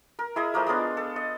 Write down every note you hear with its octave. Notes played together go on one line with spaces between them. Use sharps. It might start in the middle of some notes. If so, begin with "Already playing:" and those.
A#4
E4 G#4 D#5
F3 A3 A#3 A#4
G#3 B3 D4 F4
A4
D#5